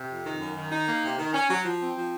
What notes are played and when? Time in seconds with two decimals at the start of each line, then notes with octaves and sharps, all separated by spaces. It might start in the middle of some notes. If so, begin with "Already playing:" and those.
Already playing: C3
0.09 F2
0.24 D#3
0.40 F#2
0.56 D#3
0.71 D#4
0.87 A#3
1.03 C3
1.18 D#3
1.33 C#4
1.49 F#3
1.64 F3
1.81 C4
1.95 F3